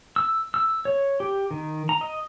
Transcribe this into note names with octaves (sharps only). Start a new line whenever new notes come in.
E6
E6
C#5
G4
D#3
A#5
D#5